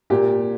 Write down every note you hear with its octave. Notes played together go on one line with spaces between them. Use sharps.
A#2 G4